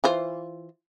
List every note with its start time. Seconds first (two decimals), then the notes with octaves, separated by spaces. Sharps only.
0.04 E3 F4 C5